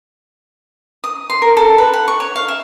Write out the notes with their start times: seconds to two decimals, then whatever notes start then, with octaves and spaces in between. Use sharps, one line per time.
1.04 D#6
1.30 C6
1.42 A#4
1.57 A4
1.78 B4
1.93 F#5
2.08 C#6
2.20 C#5
2.36 F5
2.48 E5